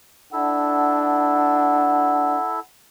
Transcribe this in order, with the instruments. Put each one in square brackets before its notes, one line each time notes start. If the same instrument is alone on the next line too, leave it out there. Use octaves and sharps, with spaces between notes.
[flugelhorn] D4 [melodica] E4 A4 [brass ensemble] F#5